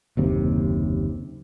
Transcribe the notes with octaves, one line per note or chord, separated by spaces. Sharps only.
F#1 D#2 C3